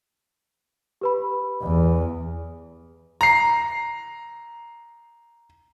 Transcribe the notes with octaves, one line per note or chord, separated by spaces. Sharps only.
G4 B4 B5
E2
A#5 C7